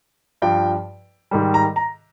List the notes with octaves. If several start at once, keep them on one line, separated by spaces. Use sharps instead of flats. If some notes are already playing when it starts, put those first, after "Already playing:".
G2 F3 G5
G#2 D#3 G3
A#5
A#5